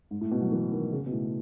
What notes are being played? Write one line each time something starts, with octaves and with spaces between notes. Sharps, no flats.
G#2
A2
B2
F#3
E3
D#3
C#3
B2
A2